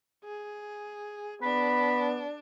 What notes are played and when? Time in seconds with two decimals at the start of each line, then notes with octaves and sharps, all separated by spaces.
0.24 G#4
1.42 B3 D4 B5